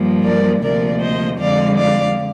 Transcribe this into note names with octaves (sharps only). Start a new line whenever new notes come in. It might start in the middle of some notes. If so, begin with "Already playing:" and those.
Already playing: G2 F3 A#3
A#4 D5
D2 C3 F3 A#3 A#4 D5
C5 D#5
F2 D3 F3 G#3 D5 F5
D5 F5